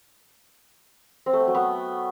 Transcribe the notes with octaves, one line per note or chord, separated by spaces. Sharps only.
C4
A3
B3
F#3
B3